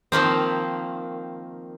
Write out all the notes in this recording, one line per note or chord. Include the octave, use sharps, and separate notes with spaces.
D#3 F3 A#3 C4